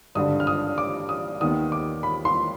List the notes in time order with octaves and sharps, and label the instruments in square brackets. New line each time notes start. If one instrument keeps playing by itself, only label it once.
[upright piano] G#1 G2 D3 D#6
F6
D#6
D6
D#6
D#2 D#3 B3 D#6
D6
B5
C6